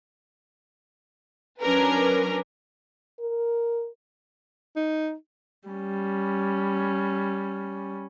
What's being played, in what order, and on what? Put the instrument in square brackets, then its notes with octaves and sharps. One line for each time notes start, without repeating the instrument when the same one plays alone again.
[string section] F#3 C#4 D4 A#4 B4
[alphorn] A#4
[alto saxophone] D#4
[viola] G3 C#4